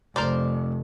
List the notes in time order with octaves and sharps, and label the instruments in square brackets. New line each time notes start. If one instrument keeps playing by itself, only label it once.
[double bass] F1 [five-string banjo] A#4 C5 D5